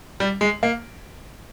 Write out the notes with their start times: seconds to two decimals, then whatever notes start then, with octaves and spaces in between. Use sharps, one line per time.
0.20 G3
0.41 G#3
0.63 A#3